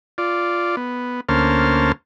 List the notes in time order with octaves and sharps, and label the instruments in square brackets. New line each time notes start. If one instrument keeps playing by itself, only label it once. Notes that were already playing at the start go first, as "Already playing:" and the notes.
[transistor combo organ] F4 D5
B3
D2 A#3 C#4 C5 A5 F6